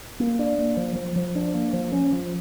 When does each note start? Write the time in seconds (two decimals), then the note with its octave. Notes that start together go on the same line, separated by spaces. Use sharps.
0.20 A#3
0.39 D4
0.58 A#3
0.77 F3
0.96 F3
1.16 F3
1.35 D4
1.54 A#3
1.73 F3
1.92 C#4
2.12 F3